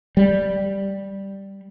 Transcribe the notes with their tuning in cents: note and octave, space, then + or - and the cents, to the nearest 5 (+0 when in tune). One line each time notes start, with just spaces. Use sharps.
G3 +0